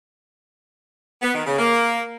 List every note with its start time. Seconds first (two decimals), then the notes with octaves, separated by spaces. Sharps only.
1.22 B3
1.34 D#3
1.46 C#3
1.58 A#3